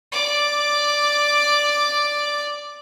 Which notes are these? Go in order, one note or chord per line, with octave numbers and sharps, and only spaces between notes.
D5 D6